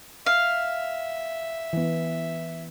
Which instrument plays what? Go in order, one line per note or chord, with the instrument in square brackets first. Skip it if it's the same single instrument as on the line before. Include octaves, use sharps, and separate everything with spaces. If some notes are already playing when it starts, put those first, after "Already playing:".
[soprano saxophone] E5 [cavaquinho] F5
[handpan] E3 B3